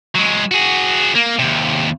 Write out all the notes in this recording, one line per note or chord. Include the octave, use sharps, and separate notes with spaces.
F#3 G#3
F#4 G#4
A#3
D#2 C3